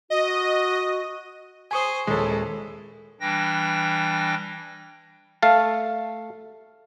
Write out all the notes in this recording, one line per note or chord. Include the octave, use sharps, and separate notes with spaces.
F#4 D#5
G#4 C5 G#5 C#6 D#6
D#1 G#3 E4 A4 C#5 D#5
E3 G3 D4 G5 A#6
A3 F5 A5